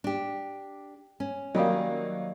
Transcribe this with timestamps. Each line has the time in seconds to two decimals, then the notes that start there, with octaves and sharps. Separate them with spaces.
0.04 D4 G4
1.20 C#4
1.55 D#3 F#3 G3 A#3 D#4